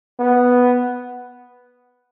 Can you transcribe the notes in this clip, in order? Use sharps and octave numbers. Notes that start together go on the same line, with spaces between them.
B3